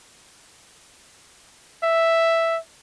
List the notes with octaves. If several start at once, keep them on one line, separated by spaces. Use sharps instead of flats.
E5